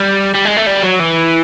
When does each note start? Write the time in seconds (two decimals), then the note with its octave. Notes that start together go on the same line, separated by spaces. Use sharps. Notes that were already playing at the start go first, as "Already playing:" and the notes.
Already playing: G3
0.34 G3
0.45 G#3
0.57 A3
0.66 G3
0.83 F#3
0.99 E3